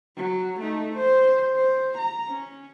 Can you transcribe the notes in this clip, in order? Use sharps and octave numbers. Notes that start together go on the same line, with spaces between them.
F#3
A3 D#4
C5
C5
A#5
C#4